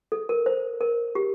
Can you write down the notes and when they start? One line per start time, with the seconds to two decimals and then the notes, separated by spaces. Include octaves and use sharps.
0.12 A4
0.29 A#4
0.46 C5
0.81 A#4
1.15 G4